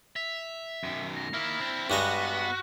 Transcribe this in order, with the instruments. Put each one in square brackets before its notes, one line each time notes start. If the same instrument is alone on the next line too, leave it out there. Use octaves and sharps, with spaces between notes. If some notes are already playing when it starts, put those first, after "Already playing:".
[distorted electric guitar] E5 [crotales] F7
[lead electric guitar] F#2 D#3
[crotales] A#6
[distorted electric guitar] D#3 A#3 [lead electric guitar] E4 [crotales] F6 B6
[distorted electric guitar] C4 D4
[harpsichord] G2 G#3 A#5 [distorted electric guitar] B3 [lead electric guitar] F#4 [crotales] C#6 F#6 F#7